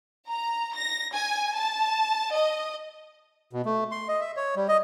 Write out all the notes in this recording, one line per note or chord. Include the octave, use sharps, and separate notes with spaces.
A#5
A#6
G#5
A5
D#5
B2
A3
C6
D#5
E5
C#5
G3
D#5